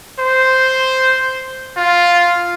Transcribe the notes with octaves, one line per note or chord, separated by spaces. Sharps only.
C5
F4